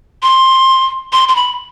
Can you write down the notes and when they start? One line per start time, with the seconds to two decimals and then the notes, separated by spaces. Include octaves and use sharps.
0.23 C6
1.13 C6
1.28 C6
1.36 B5